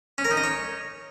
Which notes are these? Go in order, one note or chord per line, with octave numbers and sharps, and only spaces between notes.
C#4
A#4
D#4
D#5
C#5